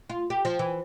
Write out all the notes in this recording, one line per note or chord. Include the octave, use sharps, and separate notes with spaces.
F4
G4
F3
E3